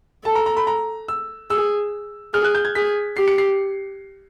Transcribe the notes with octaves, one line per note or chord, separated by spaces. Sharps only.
A4 A5
A#5
A#5
B5
A#5
E6
G#4 E6
G#4 F6
F#6
G6
G#6
G#4 B6
G4 C7
C#7
C7